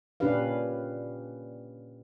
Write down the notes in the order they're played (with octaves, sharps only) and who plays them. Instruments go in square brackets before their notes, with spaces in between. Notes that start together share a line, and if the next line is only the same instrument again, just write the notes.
[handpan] A#2 C#4 D4 G4 B4 F5